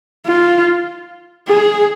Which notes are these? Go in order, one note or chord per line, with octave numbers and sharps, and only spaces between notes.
F4
G#4